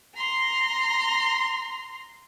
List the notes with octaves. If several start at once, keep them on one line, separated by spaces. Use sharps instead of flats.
A#5 C6